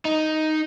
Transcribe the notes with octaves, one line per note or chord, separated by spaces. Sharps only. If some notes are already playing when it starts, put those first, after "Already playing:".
D#4